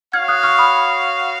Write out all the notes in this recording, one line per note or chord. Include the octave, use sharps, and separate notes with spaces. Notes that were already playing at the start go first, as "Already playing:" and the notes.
F#4 C#5 F5 F6 G#6
D#6 F#6
C#6 F6
B5 D#6